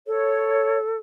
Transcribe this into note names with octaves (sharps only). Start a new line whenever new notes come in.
A4 C#5